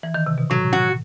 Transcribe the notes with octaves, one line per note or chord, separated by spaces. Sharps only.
E3
D#3
C3
B2
A2 F#3
F#4